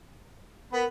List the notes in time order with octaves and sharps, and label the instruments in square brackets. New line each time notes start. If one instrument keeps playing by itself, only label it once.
[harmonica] B3 B5 [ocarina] A#4